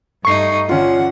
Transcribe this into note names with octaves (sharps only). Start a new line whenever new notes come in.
G2 A3 D#4 C#6 C7
D3 C#4 F4 F#5